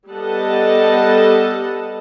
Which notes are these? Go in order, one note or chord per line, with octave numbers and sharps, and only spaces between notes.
G3 B3 A4 D#5 F#5 A5